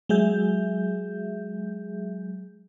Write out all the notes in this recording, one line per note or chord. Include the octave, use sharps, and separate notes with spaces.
F#3 G#3 G#4 E5 G6